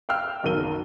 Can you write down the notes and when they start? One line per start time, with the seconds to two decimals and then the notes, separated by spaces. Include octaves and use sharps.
0.09 F5 G5 E6 F6
0.43 F#1 B1 D#3 A#4 D#7 G7